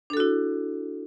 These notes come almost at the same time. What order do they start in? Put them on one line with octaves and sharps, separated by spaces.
D4 A4 F#4 E4